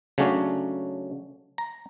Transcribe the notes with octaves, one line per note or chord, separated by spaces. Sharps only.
C#3 F#3 A3 C#4 D4
A#5